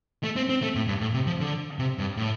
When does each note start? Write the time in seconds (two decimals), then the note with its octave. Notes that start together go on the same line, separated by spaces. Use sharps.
0.24 A3
0.36 C4
0.49 C4
0.62 A3
0.75 A2
0.88 G2
1.01 A2
1.14 C3
1.27 F3
1.40 D3
1.79 C3
1.98 G2
2.17 A2